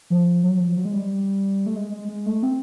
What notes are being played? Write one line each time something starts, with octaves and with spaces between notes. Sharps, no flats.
F3
F#3
F3
F#3
G#3
G3
A3
G#3
G#3
G#3
A3
C4